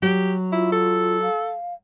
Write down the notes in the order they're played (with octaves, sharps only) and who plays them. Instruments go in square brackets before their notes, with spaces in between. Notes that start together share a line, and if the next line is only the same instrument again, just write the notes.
[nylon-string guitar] F#3 [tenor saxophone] G4
[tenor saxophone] E4 [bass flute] F4
[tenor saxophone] A4
[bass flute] F5